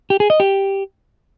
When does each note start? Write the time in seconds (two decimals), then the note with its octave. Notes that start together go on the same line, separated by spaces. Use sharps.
0.10 G4
0.20 G#4
0.30 D#5
0.40 G4